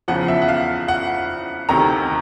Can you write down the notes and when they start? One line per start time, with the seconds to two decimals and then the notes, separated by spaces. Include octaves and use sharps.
0.08 E2 C#3 F3 F#5
0.28 E5
0.42 F#5
0.48 F5
0.88 F#5
1.69 D2 C3 D#3 A#5